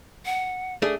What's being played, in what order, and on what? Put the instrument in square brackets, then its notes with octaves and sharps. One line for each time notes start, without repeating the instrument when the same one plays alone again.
[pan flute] F#5
[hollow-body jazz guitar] A3 D4 G#4